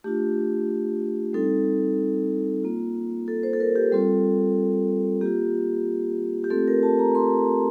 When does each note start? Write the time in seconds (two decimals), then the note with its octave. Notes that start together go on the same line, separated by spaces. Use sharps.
0.04 A3 D4 F4 G4
1.33 G3 C4 D#4 A4
2.63 A#3 F4
3.28 A4
3.43 C5
3.53 A4
3.60 A#4
3.76 G4
3.92 G3 C4 F4 A4
5.21 A#3 F4 G4
6.44 G4
6.50 A3 C4 F4 A4
6.68 A#4
6.83 A5
6.99 A#5
7.15 C6